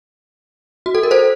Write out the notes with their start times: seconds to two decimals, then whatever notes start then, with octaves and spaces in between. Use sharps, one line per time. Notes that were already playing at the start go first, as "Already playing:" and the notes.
0.86 F#4
0.95 A4
1.03 A#4
1.11 A4 C5